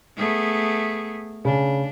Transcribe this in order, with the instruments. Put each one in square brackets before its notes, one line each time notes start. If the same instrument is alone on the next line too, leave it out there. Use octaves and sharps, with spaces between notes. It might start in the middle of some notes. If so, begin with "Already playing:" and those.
[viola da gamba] A3 B3 G#4
[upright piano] C#3 [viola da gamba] D4